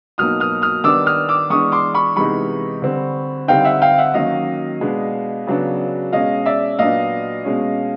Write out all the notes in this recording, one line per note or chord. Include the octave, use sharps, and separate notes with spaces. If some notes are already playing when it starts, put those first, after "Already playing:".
B2 F#3 A#3 D#4 D#6 F6
D#6 F6
D#6 F6
D#3 G3 B3 D4 D6 E6
D#6 F6
D6 E6
E3 G#3 B3 D4 C#6 D#6
C6 D6
B5 C#6
C3 E3 G#3 B3 D#4 B5 C#6
D3 G3 C4
D3 G3 C4 D#4 F5 G5
E5 F#5
F5 G5
E5 F#5
D#3 F#3 A#3 C#4 D#5 F5
B2 G#3 B3 D4
C#3 F#3 B3 D4
B2 G#3 C#4 D#5 F5
D5 E5
A#2 F#3 B3 D4 D#5 F5
B2 G#3 C#4